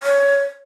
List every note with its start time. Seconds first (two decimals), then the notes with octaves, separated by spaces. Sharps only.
0.03 C#5